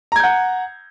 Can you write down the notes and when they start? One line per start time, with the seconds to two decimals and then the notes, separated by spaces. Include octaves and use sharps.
0.12 A#5
0.16 G#6
0.20 G6
0.24 F#5